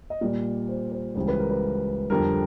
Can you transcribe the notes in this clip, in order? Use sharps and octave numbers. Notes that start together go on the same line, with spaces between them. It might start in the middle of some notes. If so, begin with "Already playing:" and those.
D#5
A#2 G3 A#3 D5
C5
C5
C#2 C#3 E3 G3 C5
B4
A#4
B4
F2 D3 G3 A#4